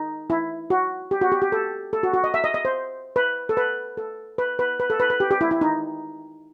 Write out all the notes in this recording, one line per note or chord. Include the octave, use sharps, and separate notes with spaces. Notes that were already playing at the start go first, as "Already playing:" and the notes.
Already playing: D#4
E4
F#4
G4
F#4
G4
G4
A4
A4
F#4
F#4
D#5
E5
D#5
D#5
C5
B4
A4
B4
A4
B4
B4
B4
A4
B4
B4
G4
G4
E4
E4
D#4